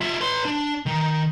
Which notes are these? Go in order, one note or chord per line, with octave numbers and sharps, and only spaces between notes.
F4 E5
B4 C6
D4
D#3